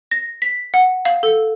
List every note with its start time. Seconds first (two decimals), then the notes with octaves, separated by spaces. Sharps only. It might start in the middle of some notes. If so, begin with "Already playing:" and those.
0.11 A#6
0.42 B6
0.74 F#5
1.05 F5
1.23 A4